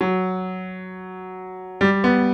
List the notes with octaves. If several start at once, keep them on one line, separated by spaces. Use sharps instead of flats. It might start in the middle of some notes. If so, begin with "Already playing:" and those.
F#3
G3
B3